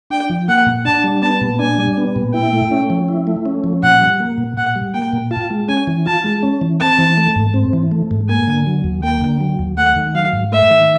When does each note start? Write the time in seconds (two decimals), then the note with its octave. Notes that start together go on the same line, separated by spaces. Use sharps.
0.10 D4 G5
0.30 F3
0.48 A#3 F#5
0.66 A#2
0.85 D4 A5
1.04 G3
1.22 B3 A5
1.41 A#2
1.59 D4 G#5
1.78 G3
1.97 B3
2.16 A#2
2.34 E4 G5
2.53 A3
2.71 C#4
2.90 F3
3.08 E4
3.27 A3
3.46 C#4
3.64 F3
3.83 A#2 F#5
4.02 G3
4.20 A#3
4.38 A#2
4.57 A#2 F#5
4.76 G3
4.94 A#3 G5
5.13 A#2
5.31 F4 A5
5.50 G#3
5.68 C#4 G#5
5.87 E3
6.06 F4 A5
6.24 G#3
6.43 C#4
6.61 E3
6.80 C4 A5
6.99 E3
7.17 A3
7.36 G#2
7.54 C4
7.73 E3
7.91 A3
8.11 G#2
8.29 A#3 G#5
8.48 D3
8.67 F#3
8.84 D#2
9.03 A#3 G5
9.21 D3
9.41 F#3
9.59 D#2
9.77 A3 F#5
9.96 D#3
10.15 F#3 F5
10.33 G#2
10.52 A3 E5
10.71 D#3